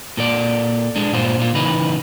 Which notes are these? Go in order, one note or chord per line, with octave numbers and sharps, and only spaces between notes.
A#2 A4 D5
G#3 D4
G2 A#2 F4 C5
A#2 F4
C#3 E3 D#4 B4